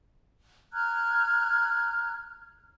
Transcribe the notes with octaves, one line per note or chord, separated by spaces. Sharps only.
A#5 F6 F#6 G#6